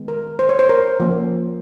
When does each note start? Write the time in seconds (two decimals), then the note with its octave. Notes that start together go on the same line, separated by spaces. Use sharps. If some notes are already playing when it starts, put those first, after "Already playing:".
Already playing: D#3 G#3 B3
0.08 A#4
0.39 C5
0.49 C#5
0.59 C5
0.69 A#4
1.00 F3 A#3 C#4